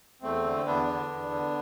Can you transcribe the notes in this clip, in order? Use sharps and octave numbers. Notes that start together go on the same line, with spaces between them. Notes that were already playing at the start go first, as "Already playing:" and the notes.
E2 A3 C4
D3
E2 B3 D4
D3
E2
D3